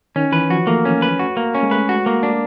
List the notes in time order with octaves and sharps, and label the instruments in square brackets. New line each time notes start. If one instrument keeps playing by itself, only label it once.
[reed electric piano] D#3 [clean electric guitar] C#4
[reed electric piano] E3 [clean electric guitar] B4
[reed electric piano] F3 [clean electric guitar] F#4
[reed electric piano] A3 [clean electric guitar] A#3
[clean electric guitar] C#4
B4
F#4
A#3
C#4
[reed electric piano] G#3
[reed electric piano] A3 [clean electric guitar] B4
[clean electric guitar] F#4
A#3
D4